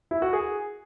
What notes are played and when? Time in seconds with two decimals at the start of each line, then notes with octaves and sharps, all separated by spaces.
0.11 E4
0.22 F#4
0.33 G#4